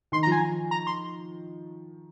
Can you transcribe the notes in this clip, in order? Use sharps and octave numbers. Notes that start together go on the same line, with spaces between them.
D#3 C6
A#5
F3 G#5
A#5
C6